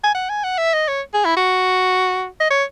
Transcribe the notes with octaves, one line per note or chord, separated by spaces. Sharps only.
G#5
F#5
G#5
F#5
E5
D#5
C#5
G#4
E4
F#4
D#5
C#5